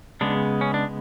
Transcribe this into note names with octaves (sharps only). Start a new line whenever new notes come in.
C#3 G#3 B3 D4
C#4
D4